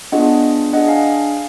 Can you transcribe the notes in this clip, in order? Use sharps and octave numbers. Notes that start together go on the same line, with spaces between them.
B3 D4 F4 G#4 D#5 F#5
D4 G#4 D#5 F#5
F5 G#5